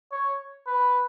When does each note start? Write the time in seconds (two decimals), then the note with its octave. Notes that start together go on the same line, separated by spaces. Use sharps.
0.12 C#5
0.67 B4